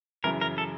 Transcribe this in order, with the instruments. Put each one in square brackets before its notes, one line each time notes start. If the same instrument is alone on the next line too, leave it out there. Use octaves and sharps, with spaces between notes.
[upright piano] F#2 C#3 E3 [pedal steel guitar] A#4
[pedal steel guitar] A#4
A4